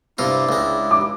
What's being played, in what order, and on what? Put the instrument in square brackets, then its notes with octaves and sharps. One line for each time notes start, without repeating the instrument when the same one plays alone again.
[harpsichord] G2 C3 F4 [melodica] D4 E4
[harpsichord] C#2 G#3
[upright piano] D6